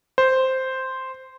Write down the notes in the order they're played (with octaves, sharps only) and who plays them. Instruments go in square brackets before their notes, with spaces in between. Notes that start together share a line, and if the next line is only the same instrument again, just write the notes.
[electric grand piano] C5